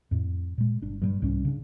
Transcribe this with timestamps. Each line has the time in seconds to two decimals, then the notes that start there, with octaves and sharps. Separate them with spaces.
0.11 F2 A2
0.58 A#2 G#3
0.81 G1 D4
1.02 G2 F#3 G3
1.22 C2 G#2 G3 C#4
1.45 C#3 D4